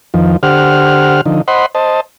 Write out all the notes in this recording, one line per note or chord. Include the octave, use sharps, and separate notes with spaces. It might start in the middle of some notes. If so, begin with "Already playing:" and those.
F2 D#3 F3
D3 G4 C5 F#5 F6
D3 F3 D#4
C5 D#5 F#5 B5 C6
C5 D#5 A5